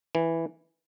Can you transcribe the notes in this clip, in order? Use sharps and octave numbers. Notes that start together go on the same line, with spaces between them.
E3